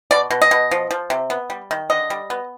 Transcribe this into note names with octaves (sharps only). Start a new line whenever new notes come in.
B2 D5
B2
D#5
B2
F3
F3
C3
B3
G3
D#3
D3 D#5
G3
B3